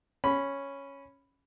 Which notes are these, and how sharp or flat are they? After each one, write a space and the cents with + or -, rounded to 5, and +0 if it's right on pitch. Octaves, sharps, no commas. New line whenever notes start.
C#4 +0 B5 +0